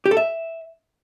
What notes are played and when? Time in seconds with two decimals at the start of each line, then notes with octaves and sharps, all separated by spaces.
0.06 G4
0.11 A4
0.17 E5